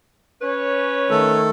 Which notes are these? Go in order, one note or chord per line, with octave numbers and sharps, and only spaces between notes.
C#4 B4 C#5
D#3 A3 A4